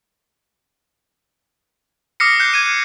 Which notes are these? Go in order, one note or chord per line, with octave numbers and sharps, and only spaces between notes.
D6 D#6 F6 A#6 C7 C#7
F#6 G6 C7
G#6 D#7